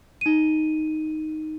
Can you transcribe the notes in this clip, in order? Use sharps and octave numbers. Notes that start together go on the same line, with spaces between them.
D#4 D#7